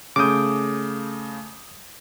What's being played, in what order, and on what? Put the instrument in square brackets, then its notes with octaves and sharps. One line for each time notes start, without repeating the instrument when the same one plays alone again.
[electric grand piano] C#3 A3 G6 [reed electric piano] D6 D#6